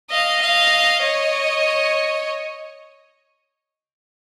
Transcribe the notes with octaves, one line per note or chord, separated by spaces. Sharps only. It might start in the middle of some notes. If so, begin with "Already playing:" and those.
D#5 F5
D#5 F5
C#5 D#5